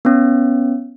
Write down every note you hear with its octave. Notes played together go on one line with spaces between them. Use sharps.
B3 C#4